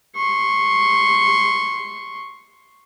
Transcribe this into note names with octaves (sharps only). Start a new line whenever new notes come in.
C6 C#6